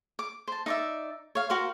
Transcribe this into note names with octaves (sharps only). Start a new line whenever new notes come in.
D6
C5 A5
D#4 D5 E5
C#5 F5
F#4 A#4 C5 F5